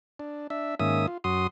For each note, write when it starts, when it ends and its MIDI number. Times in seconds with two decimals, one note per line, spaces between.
0.19 0.47 62
0.50 0.75 62
0.50 0.75 76
0.80 1.06 44
0.80 1.06 51
0.80 1.06 58
0.80 1.06 61
0.80 1.06 76
0.80 1.06 87
1.07 1.18 65
1.24 1.47 42
1.24 1.47 66
1.24 1.47 84
1.24 1.47 87